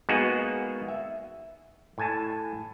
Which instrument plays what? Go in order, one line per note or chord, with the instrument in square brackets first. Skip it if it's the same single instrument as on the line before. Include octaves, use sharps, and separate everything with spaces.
[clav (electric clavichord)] G#3 A#3 B3 D#4 F#4 G#4
E5
A2 G#5 A5